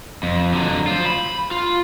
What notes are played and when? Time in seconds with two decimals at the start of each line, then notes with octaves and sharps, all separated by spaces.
0.23 F2
0.54 D3 F#3
0.87 F4 C5
1.06 B5
1.51 F4